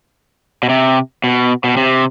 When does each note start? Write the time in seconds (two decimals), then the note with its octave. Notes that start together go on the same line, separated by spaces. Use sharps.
0.63 B2
0.69 C3
1.24 B2
1.64 B2
1.77 C3